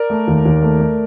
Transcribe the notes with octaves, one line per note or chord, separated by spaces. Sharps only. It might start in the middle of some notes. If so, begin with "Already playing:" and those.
Already playing: A#4 D5
A3
D#2
D#2
A3
A3